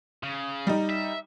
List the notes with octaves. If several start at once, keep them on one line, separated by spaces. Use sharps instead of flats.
C#3
G3 D#4
E5